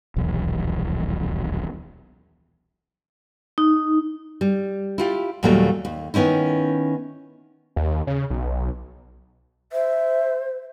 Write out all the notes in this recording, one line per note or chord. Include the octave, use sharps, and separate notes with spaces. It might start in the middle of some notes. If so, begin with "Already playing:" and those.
D#1 B1 E2
D#4
G3
E4 F4 G4
D#2 A#2 F#3 G3 A3 A#3
D#2
D#3 B3 C#4 D#4 E4
D#2
C#3
B1
C5 E5